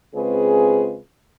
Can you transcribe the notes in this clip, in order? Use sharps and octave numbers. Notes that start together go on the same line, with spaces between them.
C#3 G#3 C4 F4 G#4 B4